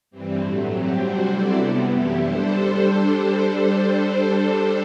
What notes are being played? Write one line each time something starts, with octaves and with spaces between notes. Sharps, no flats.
G2 E3 G3 C4
A2 F#3 A3
F#3 C4 G4
C3 G3 D4 F#4 C5
F#3 C4 E4 A4 D5
C3 G3 B3
F#2 E3 A3 E4 G4
G3 D4 A4 C5